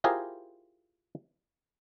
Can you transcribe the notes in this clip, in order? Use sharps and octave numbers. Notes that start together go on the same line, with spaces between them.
E4 F4 G4 G#4 A#4 C5